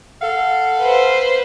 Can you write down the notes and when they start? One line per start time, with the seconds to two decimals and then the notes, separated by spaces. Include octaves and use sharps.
0.22 A4 F5 F#5
0.80 B4 C5